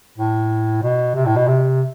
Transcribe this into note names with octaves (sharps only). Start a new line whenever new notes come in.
A2
B2
C3
A2
B2
C3